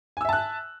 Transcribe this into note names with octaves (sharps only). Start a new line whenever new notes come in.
E5 G#5 A5 E6 F#6